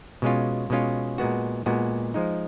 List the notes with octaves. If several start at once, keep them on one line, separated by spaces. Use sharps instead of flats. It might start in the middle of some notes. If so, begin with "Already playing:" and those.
B2 G#3 C#4 F4
B2 G#3 C#4 F4
A#2 G#3 B3 F#4
A#2 G#3 B3 F#4
F3 G#3 D#4